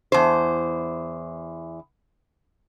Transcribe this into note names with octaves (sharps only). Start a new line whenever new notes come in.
E2 C5